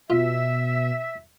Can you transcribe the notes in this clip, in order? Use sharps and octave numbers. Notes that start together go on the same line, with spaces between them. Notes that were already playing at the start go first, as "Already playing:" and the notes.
B2 F4 E5